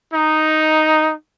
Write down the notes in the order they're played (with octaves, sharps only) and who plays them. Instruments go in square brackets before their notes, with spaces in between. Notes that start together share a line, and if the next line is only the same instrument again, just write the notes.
[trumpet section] D#4